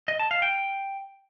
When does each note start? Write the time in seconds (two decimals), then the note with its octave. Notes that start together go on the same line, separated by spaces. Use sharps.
0.08 D#5
0.19 A5
0.31 F5
0.42 G5